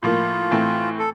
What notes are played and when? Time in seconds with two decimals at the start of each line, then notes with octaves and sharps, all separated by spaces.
0.03 A2 F3 A#3 F4
0.51 A2 E3 A3 C4
0.99 A4